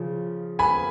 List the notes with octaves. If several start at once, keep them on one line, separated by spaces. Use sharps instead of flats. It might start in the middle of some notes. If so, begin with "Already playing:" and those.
Already playing: C#3 F3
G#5 B5